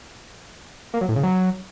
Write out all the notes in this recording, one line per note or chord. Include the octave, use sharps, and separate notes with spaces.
A#3
F#3
A2
C#3
F#3